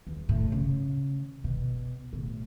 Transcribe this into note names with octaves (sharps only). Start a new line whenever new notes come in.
E2
A2
C#3
B2
A2